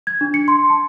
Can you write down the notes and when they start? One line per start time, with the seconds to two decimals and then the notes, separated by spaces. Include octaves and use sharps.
0.07 G#6
0.21 D4
0.34 C#7
0.48 C6
0.70 A5